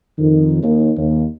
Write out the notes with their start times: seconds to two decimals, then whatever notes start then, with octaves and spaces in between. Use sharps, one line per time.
0.17 F2 D#3
0.63 D#2
0.97 D#2